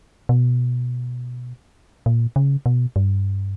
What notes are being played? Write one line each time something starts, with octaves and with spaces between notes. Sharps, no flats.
B2
A#2
C#3
B2
G2